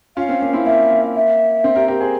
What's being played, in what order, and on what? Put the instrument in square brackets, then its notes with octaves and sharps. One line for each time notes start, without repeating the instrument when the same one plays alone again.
[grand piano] C#4 F4 [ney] F5
[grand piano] C4
A#3 C#4
C4 E4
[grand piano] A#3 [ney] E5
[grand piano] A#3
[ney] E5
[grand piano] C4
G4 A#4
G4 A#4
G#4 C5